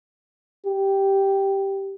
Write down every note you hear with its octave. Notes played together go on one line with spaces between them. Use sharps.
G4